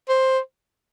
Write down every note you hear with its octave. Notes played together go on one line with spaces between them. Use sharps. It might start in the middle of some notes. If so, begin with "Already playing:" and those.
C5